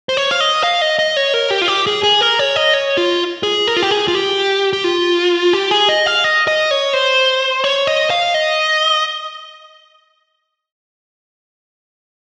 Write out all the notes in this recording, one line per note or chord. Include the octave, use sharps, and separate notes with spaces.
C5
C#5
F5
D#5
F5
D#5
D#5
C#5
A#4
G4
F4
G4
G#4
G#4
A#4
C#5
D#5
C#5
F4
G#4
A#4
F4
G4
G#4
F4
G4
G4
F4
G4
G#4
D#5
F5
D#5
D#5
C#5
C5
C#5
D#5
F5
D#5